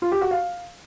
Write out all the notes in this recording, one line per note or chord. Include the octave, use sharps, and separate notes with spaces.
F4
G4
F#4
F5